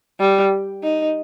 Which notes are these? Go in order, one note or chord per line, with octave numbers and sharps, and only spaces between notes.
G3
D#4